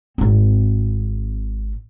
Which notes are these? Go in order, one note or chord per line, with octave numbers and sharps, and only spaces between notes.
G#1 C4